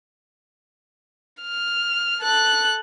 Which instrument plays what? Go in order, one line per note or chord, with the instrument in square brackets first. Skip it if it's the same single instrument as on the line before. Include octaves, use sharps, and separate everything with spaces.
[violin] F6
A4 F#6